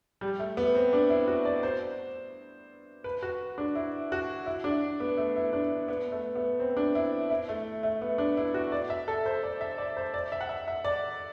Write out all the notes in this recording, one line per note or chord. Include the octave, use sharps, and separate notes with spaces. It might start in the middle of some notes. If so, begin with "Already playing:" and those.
G3
A3
B3
C4
D4
E4
F#4
D5
C5
B4
F#4
D4
E4
F#4
E4
D4
B3
A3
E4
D4
B3
A3
B3
C4
D4
E4
E4
A3
A3
B3
D4
E4
F#4
D5
E5
A4
C5
D5
E5
D5
C5
D5
E5
F#5
E5
E5
D5